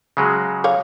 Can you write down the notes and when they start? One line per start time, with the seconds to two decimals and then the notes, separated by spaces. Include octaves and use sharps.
0.17 C#3 F#3 G#3
0.64 C#5 D5 F5